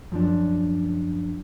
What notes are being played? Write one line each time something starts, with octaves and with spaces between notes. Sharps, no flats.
F#2 F3 D4